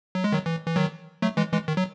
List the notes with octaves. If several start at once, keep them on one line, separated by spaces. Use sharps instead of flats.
F#3
G#3
D#3 F#3
E3
E3
D#3 F#3
F#3 A3
E3 G#3
E3 G#3
D#3
F#3